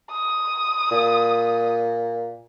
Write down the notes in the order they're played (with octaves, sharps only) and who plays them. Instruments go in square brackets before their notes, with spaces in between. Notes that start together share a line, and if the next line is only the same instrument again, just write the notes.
[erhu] D#6
[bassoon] A#2